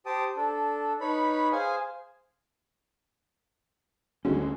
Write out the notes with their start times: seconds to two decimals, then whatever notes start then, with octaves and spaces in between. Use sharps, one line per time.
0.06 G4 C5 G5 A5 D#6
0.37 D4 A4
1.01 D#4 B4 C#5 B5
1.52 G#4 C5 F5 G#5
4.25 D2 D3 G3 G#3 C#4 F#4